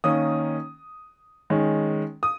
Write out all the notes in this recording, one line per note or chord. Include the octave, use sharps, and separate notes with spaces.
D#3 A#3 C#4 D#6
D#3 G#3 C#4
D#6